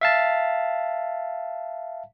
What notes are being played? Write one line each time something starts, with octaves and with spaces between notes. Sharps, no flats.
E5 F5 A5